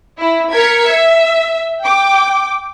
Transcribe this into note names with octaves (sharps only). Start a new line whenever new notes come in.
E4
A#4 G#6 B6 C#7
E5
G5 D6